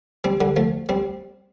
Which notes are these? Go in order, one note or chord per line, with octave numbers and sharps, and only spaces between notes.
G3 C4
D3 G3
F3 A3
G3 C4